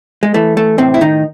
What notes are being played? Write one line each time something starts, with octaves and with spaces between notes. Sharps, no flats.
G#3
E3 A3
A3
A2 C3 C4
E4
D#3 D#4